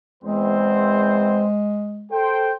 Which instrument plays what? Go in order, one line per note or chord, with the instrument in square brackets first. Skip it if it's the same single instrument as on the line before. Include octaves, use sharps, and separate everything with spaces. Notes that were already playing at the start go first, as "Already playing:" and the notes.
[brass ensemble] E2 C4 C5 [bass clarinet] G#3
[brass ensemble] A4 C5 G5